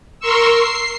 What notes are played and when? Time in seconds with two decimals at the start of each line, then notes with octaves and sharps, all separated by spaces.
0.20 A#4 C6 C#6 E6
0.53 C7